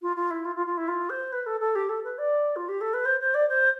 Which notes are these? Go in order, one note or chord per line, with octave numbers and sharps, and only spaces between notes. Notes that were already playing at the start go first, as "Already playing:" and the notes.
F4
F4
E4
F4
F4
F4
E4
F4
C5
B4
A4
A4
G4
A4
B4
D5
F4
G4
A4
B4
C5
C5
D5
C5